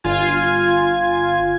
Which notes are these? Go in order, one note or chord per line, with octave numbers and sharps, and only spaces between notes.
G1 F4 G#5 G#6